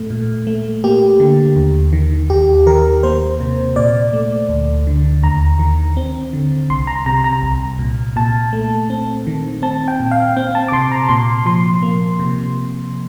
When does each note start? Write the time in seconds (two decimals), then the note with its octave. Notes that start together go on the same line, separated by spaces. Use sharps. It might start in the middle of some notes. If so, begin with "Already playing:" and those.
Already playing: A2 A3
0.10 A#2
0.47 A3
0.84 A#3 G4
1.20 D3
1.56 D#2
1.93 D#3
2.30 D#2 G4
2.66 D#3 A#4
3.03 A#3 C5
3.40 C3
3.76 A#2 D5
4.13 A3
4.49 D2
4.87 D3
5.23 D#2 A#5
5.59 D#3
5.97 C4
6.33 D3
6.70 C2 C6
6.87 A#5
7.06 C3 A#5
7.24 A#5
7.43 C2
7.79 A#2
8.16 A#2 A5
8.53 A3
8.90 C4
9.27 D#3
9.62 C4 A5
9.88 G5
10.00 A#2
10.11 F5
10.36 C4 G5
10.55 A5
10.68 D6
10.72 C3 C6
10.92 A#5
11.09 A#2 C6
11.46 F3 C6
11.83 A#3
12.19 C3